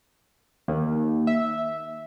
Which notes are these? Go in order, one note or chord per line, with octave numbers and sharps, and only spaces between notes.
D#2
E5